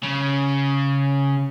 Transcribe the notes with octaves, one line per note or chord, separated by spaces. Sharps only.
C#3